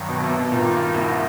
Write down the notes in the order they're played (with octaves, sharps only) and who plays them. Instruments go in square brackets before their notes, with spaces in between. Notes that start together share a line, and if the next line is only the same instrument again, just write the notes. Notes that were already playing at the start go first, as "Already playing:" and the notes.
Already playing: [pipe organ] G2 D#3 F#3
[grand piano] B2
C3
B2
[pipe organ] G2 D#3 G3 A#3 D#4 [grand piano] A#2
[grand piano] C2 C3